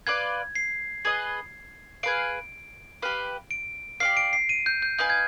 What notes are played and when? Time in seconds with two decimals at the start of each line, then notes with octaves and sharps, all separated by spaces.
0.07 F4 B4 D5 F5 G#6
0.55 C7
1.05 G#4 B4 D#5
2.03 G#4 B4 F5 D7
3.02 G4 B4 F5
3.51 D7
4.00 G4 D5 F5 C7
4.17 D7
4.33 C7
4.49 D#7
4.66 G6
4.82 G6
4.98 D#4 B4 F5 G#5 G6
5.10 G#6